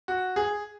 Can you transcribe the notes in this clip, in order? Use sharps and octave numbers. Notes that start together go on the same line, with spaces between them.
F#4
G#4